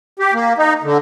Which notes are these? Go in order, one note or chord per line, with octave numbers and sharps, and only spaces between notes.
G4
A#3
D#4
D3